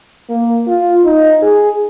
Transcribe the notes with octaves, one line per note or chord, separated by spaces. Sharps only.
A#3
F4
D#4
G#4